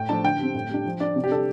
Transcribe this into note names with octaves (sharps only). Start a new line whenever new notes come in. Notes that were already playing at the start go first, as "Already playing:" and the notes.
Already playing: A2 G5
F3 A3 D4 A5
D3 G5
G3 C4
A2
G3 D4
F3
D4 D5
C3
G4
G3 D4 A4